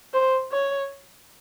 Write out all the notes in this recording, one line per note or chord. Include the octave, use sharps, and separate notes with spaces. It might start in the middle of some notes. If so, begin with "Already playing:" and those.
C5
C#5